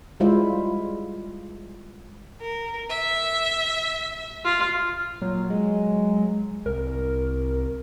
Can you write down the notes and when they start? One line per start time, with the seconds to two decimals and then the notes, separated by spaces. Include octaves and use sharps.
0.20 G3 G#3 E4 F4 C5 E5
2.41 A#4
2.89 E5
4.45 F4
5.22 A#2 F#3
5.50 G#3
6.66 C2 A#4